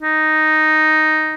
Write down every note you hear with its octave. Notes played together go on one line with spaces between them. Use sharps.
D#4